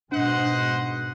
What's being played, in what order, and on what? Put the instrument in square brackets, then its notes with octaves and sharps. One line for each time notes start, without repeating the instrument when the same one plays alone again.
[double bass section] G#2 B2 [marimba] D4 [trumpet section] C5 D#5 F#5